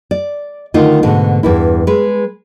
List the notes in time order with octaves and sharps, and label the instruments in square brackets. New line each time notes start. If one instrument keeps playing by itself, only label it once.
[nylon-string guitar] D5
D3 D#3 A3 D#4 F4
G#2 B2 D3 A3
E2 G2 E4
G#3 B4